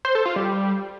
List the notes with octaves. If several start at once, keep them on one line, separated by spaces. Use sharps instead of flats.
C5
A4
F4
G3